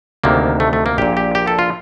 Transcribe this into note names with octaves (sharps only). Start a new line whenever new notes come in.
D2 C3 D#3 A#3
A3
A3
A#3
A#1 A#2 G4
G4
G4
A4
F4